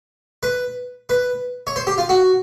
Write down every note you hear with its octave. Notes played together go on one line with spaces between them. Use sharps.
B4
B4
C#5
C5
G4
F4
F#4